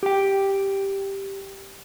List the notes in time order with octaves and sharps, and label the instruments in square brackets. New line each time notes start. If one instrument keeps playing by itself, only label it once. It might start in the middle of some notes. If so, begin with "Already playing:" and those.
[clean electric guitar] G4 G5